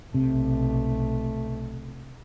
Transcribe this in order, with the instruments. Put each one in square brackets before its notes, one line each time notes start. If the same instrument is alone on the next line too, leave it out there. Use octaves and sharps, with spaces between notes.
[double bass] B1 A3 [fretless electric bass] C3